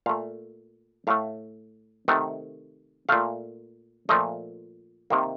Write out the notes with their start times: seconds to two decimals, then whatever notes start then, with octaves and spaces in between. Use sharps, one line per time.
0.06 A#2 A3 F5
1.07 A2 A3 F5
2.08 C3 D#3 A3 F#5
3.09 A#2 A3 F5
4.09 A#2 F3 A3 D#5
5.10 C3 D#3 A#3